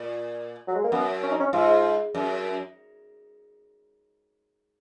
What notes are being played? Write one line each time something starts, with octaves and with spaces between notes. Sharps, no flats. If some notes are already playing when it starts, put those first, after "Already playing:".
Already playing: A#2
F#3
G#3
A#3
F#2 B3
C#4
D#4
C#4
G#2 F4
F#2